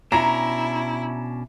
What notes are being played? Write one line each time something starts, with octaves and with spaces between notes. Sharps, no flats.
B2 C#4 D4 E4 A#5